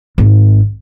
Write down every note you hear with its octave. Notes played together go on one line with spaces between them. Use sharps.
G#1